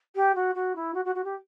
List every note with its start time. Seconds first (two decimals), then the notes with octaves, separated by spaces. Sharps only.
0.15 G4
0.35 F#4
0.55 F#4
0.75 E4
0.94 F#4
1.05 F#4
1.15 F#4
1.24 G4